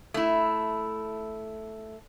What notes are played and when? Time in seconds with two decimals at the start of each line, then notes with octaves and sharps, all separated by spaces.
0.14 A3 E4